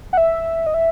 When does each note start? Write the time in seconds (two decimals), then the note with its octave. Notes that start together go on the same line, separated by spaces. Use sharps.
0.13 F#5
0.17 E5
0.67 D#5
0.74 E5